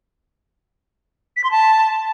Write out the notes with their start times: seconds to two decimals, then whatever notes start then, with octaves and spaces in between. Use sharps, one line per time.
1.36 B6
1.44 C6
1.51 A5